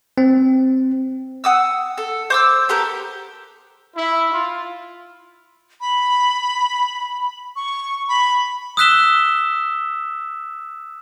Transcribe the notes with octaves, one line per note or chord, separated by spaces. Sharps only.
C4
F#5 D#6 E6
A4
C5 D6 E6
B3 G4 A4 A#4
E4
F4
B5
C#6
B5
D#6 E6 F#6 B6 E7 G7